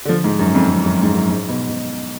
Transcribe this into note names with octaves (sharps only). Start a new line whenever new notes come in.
D3
F3
G#2
F#2
F2
F2
F#2
G#2
F#2
G#2
B2
B2